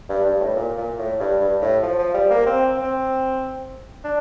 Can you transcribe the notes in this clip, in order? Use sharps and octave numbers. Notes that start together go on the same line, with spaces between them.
G2
G2
A2
A#2
A#2
A2
G2
G2
A2
F3
F3
G3
A#3
C4
C4
D4